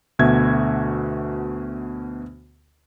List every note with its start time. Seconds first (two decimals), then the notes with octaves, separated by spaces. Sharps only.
0.19 D2 B2 F#4 E5 G#6